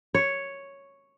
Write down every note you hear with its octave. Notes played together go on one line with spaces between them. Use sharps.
C#5